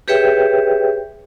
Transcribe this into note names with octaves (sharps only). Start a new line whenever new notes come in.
G4 G#4 B4 C#5 E5 G5